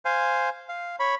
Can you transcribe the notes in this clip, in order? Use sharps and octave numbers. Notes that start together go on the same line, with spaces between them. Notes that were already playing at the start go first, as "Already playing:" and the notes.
C5 F5 G#5
F5
C#5 B5